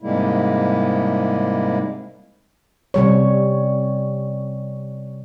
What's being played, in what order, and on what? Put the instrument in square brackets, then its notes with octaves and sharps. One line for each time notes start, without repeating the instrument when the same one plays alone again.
[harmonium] G#2 C3 G3 G#3 A#3 E4
[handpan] C3 G3 C#5